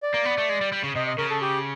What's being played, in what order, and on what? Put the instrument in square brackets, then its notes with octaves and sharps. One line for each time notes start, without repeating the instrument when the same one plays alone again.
[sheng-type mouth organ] D5
[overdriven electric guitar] A#3
B3
A3
G#3
G3
G3
C#3
[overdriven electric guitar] C3 [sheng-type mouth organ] D#5
[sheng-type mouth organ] D#5
[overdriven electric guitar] C#3 [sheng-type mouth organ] A#4
[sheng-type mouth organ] A4
G4